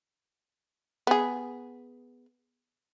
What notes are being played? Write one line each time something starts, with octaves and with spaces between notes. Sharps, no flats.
B3 G#4